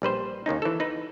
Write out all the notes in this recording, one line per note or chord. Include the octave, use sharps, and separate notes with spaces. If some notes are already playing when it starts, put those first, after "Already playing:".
A#1 G3 B4 C5
D#2 D#3 C#4 D#4
E3 A4
D#4 B4